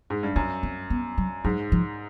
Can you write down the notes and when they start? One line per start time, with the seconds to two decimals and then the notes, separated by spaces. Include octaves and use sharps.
0.10 G#2
0.23 G2
0.36 F#2 C#4
0.63 C4
0.90 B3
1.18 F#3
1.44 G#2 F#3
1.72 F3